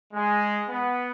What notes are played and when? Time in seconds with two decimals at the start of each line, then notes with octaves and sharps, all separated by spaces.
0.13 G#3
0.68 B3